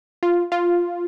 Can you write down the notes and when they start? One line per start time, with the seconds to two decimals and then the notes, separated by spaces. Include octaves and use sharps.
0.23 F4
0.52 F4